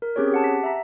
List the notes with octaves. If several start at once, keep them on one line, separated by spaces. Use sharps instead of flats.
A#4
C4 C#4 G4 G#4 C#5
G4 F#5 A5
B6
E5 A#5